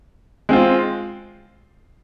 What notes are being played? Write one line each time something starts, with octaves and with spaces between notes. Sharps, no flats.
G#3 C4 F4